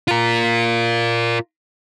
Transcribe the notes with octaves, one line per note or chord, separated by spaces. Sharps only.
F4 A#4